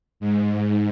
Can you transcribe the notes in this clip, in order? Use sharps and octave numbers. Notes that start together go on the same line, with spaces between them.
G#2